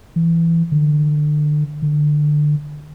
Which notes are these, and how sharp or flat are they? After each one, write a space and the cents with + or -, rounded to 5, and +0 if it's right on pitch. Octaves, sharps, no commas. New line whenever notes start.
E3 +15
D3 +30
D3 +20